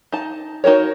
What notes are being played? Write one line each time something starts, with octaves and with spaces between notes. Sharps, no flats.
D#4 A5
D#4 F#4 A#4 C#5